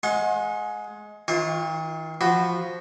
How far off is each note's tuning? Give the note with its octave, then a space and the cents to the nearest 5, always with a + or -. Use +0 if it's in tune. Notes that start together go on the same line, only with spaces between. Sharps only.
G#3 +15 F#5 -35 C6 +40
D#3 +45 F4 +0 C#5 -40
F3 +0 F#4 +5 B5 +0